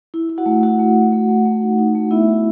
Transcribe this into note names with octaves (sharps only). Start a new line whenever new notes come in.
E4
E4
F#4 F#5
A3
A3 F#4 F#5
A3
A3
A3
A3
A3
D#4
D#4
A3
B3 E4 E5
F#4